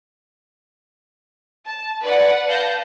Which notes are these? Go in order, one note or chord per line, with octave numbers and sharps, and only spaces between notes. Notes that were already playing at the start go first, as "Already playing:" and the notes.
A5
B4 D5 F#5
B4 F5 A5 G6 A#6